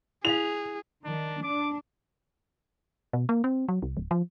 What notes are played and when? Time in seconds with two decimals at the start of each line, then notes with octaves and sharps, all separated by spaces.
0.25 E4 G#4 F5 F7
1.04 D#3 D4
1.43 D4 D6
3.13 B2
3.29 A#3
3.44 C4
3.69 F#3
3.82 C2
3.97 D1
4.11 F3